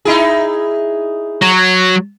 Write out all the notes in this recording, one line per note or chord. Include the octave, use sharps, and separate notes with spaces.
D#4 E4 G#4
F#3